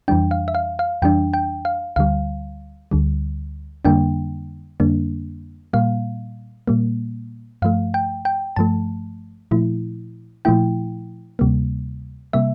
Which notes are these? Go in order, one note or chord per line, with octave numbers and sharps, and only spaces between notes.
F2 E3 G3 D4 G5
F5
E5
F5
F5
F2 E3 G3 D4 G5
G5
F5
D2 D3 G3 F5
D2 D3 G3
F2 D3 G3 A#3 D4 G5
F2 D3 G3 A#3 D4
A#2 G3 A#3 F5
A#2 G3 A#3
G2 F3 A3 F5
G5
G5
G2 F3 A3 A5
A#2 F3 A3 E4
A#2 F3 A3 E4 G5
D2 C3 G3 A#3
C3 G3 A#3 E5